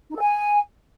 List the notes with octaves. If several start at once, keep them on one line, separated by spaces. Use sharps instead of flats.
D#4
A4
G#5